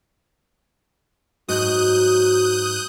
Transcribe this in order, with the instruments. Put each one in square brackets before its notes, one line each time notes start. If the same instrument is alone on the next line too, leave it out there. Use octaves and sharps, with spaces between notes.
[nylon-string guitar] G#2 F#4 [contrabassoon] F#3 [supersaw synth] D#6 F#6 G6